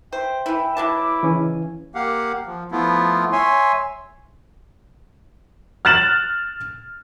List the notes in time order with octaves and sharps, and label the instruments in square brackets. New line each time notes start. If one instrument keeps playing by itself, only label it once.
[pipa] C5 [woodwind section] E5 G5
[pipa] E3 E4
[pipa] F#3 E5 A5 [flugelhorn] E4 [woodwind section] B4 D6
[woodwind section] G#2 C#3 G#5 [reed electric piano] E3 C#4
[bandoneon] A#3 G4 F5 F#5
F3
F3 A3 B3 E4 F4
C#5 E5 G#5 C6
[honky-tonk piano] F6 F#6 A6 E7 F#7